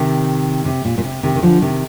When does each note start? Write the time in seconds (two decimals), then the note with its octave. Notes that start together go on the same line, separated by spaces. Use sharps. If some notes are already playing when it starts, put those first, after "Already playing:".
Already playing: C3 D#3
0.65 C3
0.85 A#2
0.98 A#2
1.04 C3
1.23 C3 D#3
1.36 D#3
1.42 D3 F3
1.61 C3 D#3